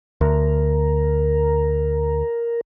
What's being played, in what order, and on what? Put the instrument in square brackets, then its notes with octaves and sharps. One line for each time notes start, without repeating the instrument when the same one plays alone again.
[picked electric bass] D2 [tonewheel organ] A#4